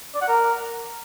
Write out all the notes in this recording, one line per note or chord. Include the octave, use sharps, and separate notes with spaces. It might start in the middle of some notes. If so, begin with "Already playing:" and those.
D5
F#5
A#4